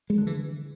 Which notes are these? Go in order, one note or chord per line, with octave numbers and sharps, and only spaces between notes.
G#3
D3
E3